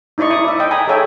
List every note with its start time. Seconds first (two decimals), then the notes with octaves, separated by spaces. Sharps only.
0.18 D#4 E4 D5 D#5 C#6
0.30 E4 D6 D#6
0.44 D5 E5
0.59 D#5 G5
0.71 G#5 A#5 B5 D#6
0.88 G#4 A4 C#5 E5 G5